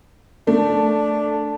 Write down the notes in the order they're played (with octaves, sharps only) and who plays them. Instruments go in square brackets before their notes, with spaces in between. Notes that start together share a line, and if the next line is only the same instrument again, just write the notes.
[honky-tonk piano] A3 [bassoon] D4